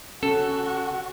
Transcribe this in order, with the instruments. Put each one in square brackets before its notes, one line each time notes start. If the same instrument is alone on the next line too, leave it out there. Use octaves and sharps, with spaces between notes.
[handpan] C#4 [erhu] F#4 [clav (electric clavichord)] A4